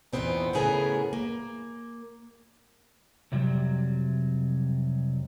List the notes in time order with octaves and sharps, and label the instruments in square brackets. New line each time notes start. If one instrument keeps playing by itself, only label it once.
[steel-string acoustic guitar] E2 A#2 D#3 B3 C4 D#4
A2 C#3 B3 G#4 A#4 G#5
A#3
[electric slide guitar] F2 C3 F#3 G3